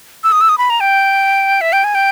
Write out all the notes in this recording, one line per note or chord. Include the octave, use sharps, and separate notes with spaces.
E6
D#6
E6
D#6
B5
A#5
G5
E5
G5
G#5
G5